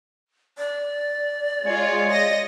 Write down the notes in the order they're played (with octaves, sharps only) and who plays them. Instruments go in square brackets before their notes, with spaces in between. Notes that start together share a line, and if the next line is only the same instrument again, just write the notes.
[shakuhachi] D5
[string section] G#3 F4 [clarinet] C#5
[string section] D#5 A#6